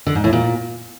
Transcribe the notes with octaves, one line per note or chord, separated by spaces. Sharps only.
D3
G#2
A2
A#2